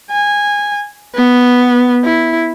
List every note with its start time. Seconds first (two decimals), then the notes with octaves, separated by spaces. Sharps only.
0.11 G#5
1.15 B3
2.04 E4